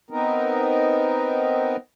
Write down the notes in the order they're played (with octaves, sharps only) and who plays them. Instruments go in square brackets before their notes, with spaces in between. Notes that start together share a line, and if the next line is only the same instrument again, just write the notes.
[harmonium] B3 C4 D#4 A#4